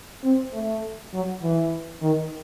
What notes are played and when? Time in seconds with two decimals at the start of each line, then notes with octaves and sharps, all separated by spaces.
0.24 C4
0.53 A3
1.13 F#3
1.43 E3
2.02 D#3